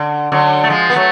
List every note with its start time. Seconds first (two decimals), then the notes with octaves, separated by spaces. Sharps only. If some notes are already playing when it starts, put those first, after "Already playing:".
Already playing: D3
0.32 D3 F#3
0.64 A3
0.70 F3 G#3
0.90 B3
0.96 F#3 A3